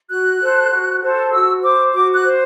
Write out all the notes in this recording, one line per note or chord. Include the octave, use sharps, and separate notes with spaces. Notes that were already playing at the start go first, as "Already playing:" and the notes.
F#4 F#6
A4 C5
F#4
A4 C5
F#4 E6
C5 D6
F#4 D6
F#6
C5